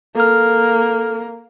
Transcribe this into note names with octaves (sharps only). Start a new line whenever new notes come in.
A#3 A4 F6